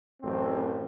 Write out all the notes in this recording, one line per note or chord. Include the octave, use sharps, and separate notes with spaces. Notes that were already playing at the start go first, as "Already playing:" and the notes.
A1 F#2 C4